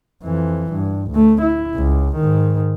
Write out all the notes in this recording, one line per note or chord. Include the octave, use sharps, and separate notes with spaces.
F2 E3
G2
D2 A3
E4
C#2
G#2 D#3